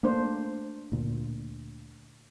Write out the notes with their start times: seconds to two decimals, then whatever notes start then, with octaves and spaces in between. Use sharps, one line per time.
0.03 A3 A#3 D4 C5
0.92 D2 A#2